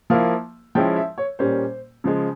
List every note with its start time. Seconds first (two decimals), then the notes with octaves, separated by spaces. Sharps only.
0.10 F3 A#3 E4 F5
0.75 F3 G#3 C#4 E4 G5
0.96 E5
1.18 C#5
1.39 A#2 G3 A#3 C#4 C5
2.04 C#3 F3 G#3